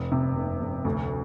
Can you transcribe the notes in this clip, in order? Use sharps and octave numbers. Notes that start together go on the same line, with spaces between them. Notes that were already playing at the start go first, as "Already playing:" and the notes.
Already playing: F1
C3
F1
F1
D2